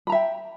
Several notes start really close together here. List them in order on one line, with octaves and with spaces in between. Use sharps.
B5 A#5 E5 G5